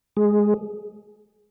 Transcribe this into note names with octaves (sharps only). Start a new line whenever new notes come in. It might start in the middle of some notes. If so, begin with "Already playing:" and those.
G#3 G#4